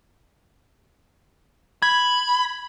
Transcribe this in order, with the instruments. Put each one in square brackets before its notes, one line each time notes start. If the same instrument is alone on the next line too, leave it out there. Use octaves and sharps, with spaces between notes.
[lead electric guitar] B5 [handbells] G#6